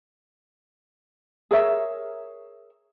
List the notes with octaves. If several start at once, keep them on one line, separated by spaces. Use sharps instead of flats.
G#4 A#4 C#5 E5